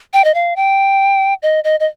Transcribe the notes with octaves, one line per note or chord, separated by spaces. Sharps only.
G5
D#5
F5
G5
D#5
D#5
D#5